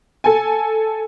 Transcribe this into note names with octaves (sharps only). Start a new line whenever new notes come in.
A4 G#5